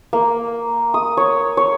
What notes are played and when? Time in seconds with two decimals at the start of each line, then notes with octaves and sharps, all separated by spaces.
0.13 A#3
0.94 D#6
1.17 C#5
1.57 C#5